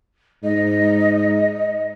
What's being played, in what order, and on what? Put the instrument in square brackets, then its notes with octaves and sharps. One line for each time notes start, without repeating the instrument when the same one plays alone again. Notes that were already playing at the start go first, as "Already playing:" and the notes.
[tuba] G#2 [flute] D#5